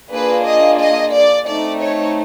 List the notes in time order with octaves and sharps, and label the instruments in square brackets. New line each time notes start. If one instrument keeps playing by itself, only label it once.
[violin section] A#3 D4 F4 G#4 B4
D#5
D#5
D5
A3 C4 D#4 D5
C#5